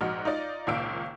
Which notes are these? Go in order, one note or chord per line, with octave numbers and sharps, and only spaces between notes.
A#1 G#2 F#4 D#5 F6
D#4 F4 D5 D#5
G#1 C#2 A#2 F5 E6 D7